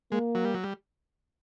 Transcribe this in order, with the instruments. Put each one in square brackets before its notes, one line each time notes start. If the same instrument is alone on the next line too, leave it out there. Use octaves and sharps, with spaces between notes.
[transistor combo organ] G#3 [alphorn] A#3
[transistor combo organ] F#3
G3
F#3
G3